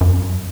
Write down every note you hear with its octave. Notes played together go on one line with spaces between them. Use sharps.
F#2